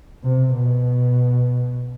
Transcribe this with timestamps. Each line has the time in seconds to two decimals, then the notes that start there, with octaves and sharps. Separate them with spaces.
0.24 C3
0.55 B2